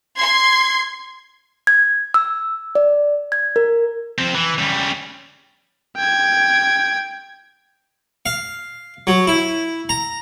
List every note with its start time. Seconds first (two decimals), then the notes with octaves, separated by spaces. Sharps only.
0.17 C6 G#6
1.67 G#6
2.14 E6
2.75 D5
3.32 G#6
3.56 A#4
4.18 F3 C4
4.35 E3
4.59 C#3 G3
5.97 G5 G#6
8.26 F5
9.07 F#3
9.27 E4
9.89 A#5